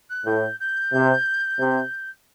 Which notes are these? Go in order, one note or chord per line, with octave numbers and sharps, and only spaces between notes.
F#6
A2 G6
G6
C3
C3